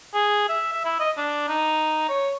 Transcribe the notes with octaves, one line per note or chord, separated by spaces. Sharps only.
G#4
E5
E5
E4
D#5
D4
D#4
C#5